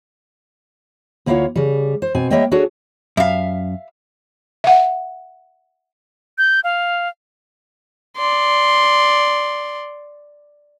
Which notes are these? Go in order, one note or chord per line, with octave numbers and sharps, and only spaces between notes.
D2 A#3 E4 F4 C#5 F#5
C#3 G3
C5
B2 C4 G#5
G3 A#3 C#5 D#5 E5 G5
D4 F#4 G#4 A4 C#5
F#2 E5 F5
E5 F#5
G6
F5
D5 C6